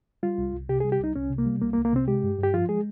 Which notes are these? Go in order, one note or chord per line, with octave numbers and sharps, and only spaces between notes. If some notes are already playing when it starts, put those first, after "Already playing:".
G3 F4
C2
C2
C3 G4
G#4
G3
G4
C2 D#4
C2 C#4
C3
A#3
G3
C2 A#3
A#3
C2
A#3
C3 C4
G#3 G4
G2
G2
G4
F3 F4
G#3 G#4